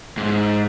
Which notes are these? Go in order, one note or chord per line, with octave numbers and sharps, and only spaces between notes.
G#2